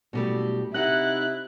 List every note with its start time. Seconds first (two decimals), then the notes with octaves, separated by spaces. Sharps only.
0.13 F#1 B2 G3 A3
0.74 C3 D#4 E4 F#5 F#6